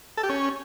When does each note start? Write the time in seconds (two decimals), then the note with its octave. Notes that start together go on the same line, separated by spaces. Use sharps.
0.17 A4
0.23 G4
0.29 C#4